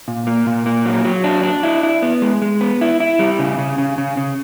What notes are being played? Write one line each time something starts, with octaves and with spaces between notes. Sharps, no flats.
A#2
A#3
A#2
A#3
F#3
F#3
D4
D4
E4
E4
B3
G#3
G#3
B3
E4
E4
G3
C#3
C#3
C#3
C#3
C#3